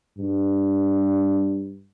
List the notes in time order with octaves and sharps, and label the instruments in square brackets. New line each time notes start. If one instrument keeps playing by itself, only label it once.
[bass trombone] G2